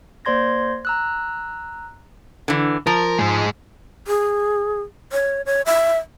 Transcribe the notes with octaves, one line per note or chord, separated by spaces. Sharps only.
A#3 C5 D5 C6 G#6 A#6
A#5 E6 F#6
D3 E3
F3 A#4
G#2 G#3
G#4
C#5
C#5
E5